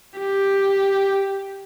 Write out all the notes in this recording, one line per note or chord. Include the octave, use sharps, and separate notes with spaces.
G4